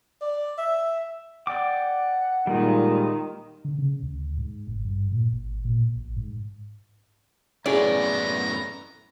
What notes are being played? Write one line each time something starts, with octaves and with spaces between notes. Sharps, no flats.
D5
E5
D5 F#5 G5 D6
A#2 D#3 G3 G#3
D3
C#3
D2
G#2
G1
G2
A#2
G#1
A#2
A1
G#2
F#2 A2 B3 C#4 E4 G#4 D5 A#5